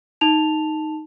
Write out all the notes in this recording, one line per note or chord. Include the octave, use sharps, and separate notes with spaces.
D#4 A5 F7